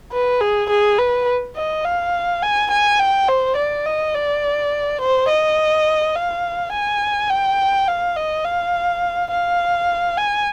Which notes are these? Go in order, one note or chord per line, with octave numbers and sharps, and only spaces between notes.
B4
G#4
G#4
B4
D#5
F5
G#5
G#5
G5
C5
D5
D#5
D5
C5
D#5
F5
G#5
G5
F5
D#5
F5
F5
G#5